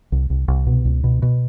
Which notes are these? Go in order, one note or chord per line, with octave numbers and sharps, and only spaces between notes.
C2
C2
C2
B2
C#2
B2
B2